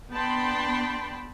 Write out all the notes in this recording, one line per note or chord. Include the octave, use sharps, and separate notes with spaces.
B3 D4 G5 A5 B5 C6